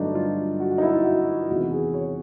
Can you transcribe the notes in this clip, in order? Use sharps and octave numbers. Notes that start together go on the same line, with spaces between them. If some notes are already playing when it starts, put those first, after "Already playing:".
Already playing: G2 D3 F#3 A3 D4 D#4
F4
F#4
F#4
D#4
E4
F4
F#4
E2 C3 D#3 G#3 F#4
G#4
C#5